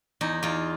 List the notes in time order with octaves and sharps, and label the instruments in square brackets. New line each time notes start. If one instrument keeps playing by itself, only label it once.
[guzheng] E2 D#4
E2 F4